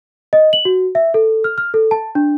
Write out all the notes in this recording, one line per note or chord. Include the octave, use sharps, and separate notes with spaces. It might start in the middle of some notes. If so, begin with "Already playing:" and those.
D#5
F#7
F#4
E5
A4
F6
F6
A4
A5
D4